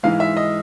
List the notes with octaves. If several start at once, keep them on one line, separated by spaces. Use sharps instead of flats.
G#2 E3 G#3 F5
E5
D#5